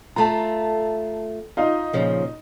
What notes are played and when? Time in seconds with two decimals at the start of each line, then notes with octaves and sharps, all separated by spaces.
0.16 A3 F4 A5 A#5
1.57 D#4 F4 F5
1.93 A#2 C#3 F3